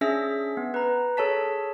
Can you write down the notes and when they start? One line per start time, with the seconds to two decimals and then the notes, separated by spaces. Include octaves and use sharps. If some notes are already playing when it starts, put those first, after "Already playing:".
0.01 C#4 D4 G#4 E5 E6 A#6
0.57 B3
0.74 B4 A#5
1.17 G#4 A4 C#5 A5 B6